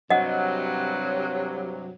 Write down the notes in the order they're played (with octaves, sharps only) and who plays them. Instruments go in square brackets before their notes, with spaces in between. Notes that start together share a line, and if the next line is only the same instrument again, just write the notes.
[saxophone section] G2 C3 F#3 [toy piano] D#5 F#5